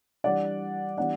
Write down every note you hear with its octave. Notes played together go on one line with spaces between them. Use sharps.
E3 G3 D4 D5 F#5
E3 G3 B3 D4 D5 F#5